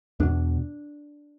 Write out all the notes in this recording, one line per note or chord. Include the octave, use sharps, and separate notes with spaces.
E2 B2 D4